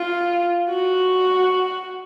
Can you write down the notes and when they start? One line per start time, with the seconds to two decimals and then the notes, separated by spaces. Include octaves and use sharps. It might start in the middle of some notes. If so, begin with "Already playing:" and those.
Already playing: F4
0.70 F#4